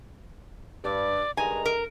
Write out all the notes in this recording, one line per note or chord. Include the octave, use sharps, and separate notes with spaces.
G2 D5
G2 D#3 G#3 G#5 A#5
A#4